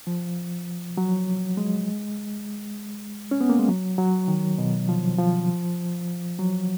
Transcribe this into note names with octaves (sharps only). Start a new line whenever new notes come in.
F3
F#3
G#3
C#4
B3
A#3
G#3
F#3
F#3
D#3
B2
F3
F3
F#3